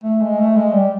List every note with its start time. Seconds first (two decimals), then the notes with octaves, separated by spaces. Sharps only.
0.04 A3
0.21 G#3
0.39 A3
0.57 G#3
0.73 G3